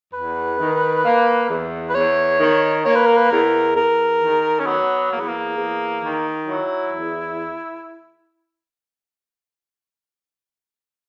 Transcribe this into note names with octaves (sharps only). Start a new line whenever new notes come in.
E2 B4
D#3
A#3
E2
B4
E2 C#5
D#3
A#3 C#5
B4
A#4
B4
E2 A#4
E2 A#4
D#3
C#4
F#3 B3
E2 A#3
B3
A#3
E2
D#3
F#3 E4
E2